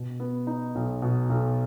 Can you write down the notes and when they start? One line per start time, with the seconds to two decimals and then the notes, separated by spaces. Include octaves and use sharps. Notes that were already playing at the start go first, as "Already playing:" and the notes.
Already playing: B2
0.20 B3
0.47 D#4
0.75 B1
1.02 B2
1.30 B1